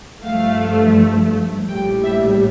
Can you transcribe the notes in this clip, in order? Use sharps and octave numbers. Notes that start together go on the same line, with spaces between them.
G2 F3 A3 F5
A#1 A2 G3 G5
E5